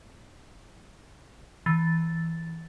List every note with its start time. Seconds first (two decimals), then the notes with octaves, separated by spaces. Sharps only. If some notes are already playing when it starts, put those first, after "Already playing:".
1.66 E3 A6